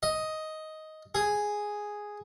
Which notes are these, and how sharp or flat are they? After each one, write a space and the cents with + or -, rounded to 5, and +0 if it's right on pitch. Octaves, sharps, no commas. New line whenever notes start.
D#5 +10
G#4 +0